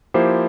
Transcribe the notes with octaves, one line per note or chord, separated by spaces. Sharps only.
F3 A#3 E4 G4 C5